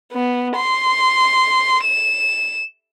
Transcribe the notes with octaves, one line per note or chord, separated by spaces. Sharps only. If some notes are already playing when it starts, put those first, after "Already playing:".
B3
C6
E7